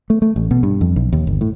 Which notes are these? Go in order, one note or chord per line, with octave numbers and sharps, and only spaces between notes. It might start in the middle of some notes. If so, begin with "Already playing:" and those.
A3
A3
A1
B2
G2
F2
B1
D#2
G1
A2